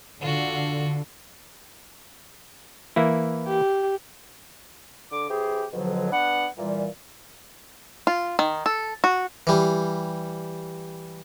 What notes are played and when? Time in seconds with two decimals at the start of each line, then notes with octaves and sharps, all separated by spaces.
0.21 D3 F4 F#4
2.96 E3 A#3 E4
3.47 G4
5.12 D3 D6
5.30 E3 C4 G4 G#4
5.73 F2 G#2 B2 D3 F3 F#3
6.12 B3 D4 B4 F#5
6.58 A#2 E3 G3
8.07 F4
8.39 D#3
8.66 A4
9.04 F#4
9.47 E3 G3